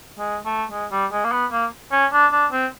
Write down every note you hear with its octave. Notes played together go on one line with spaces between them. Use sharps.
G#3
A3
G#3
G3
G#3
A#3
B3
A#3
C#4
D4
D4
C4